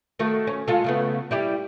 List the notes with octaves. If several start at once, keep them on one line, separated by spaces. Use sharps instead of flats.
D#3 A3 F#4
C#4
G#3 F4 A4
C#3 A3 B3
G3 E4 G4